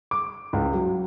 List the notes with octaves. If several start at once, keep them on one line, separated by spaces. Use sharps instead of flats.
D6
C#2
F#3